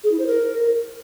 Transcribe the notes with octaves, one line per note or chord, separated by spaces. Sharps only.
G#4
E4
C5
A#4